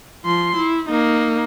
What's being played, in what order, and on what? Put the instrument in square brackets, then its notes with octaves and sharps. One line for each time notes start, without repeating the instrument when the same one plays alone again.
[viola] F3 C6
E4
A#3 D#4